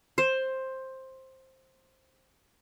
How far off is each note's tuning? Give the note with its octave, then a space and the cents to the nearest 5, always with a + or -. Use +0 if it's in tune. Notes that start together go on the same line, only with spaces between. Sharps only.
C5 +10